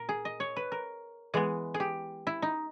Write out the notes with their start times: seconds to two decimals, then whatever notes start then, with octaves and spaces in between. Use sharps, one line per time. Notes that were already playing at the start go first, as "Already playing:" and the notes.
Already playing: A#2 A#4
0.09 G#4
0.25 D#5
0.40 C#5
0.56 B4
0.72 A#4
1.34 E3 G#3 B3 G#4
1.74 G#4
1.80 G4
2.27 E4
2.42 D#4